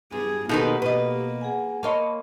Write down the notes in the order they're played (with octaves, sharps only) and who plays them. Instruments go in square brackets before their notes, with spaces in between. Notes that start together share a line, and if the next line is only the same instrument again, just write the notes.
[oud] G2 [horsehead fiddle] G#4
[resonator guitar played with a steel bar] B2 D#3 B4 [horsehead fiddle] A#3 [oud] D#4 A4 C5 [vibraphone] G4
[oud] B2 D#5 [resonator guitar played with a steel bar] B4
[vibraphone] G#4 F#5 G#5
[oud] A#3 C#5 D#5 [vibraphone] A5 B5 C6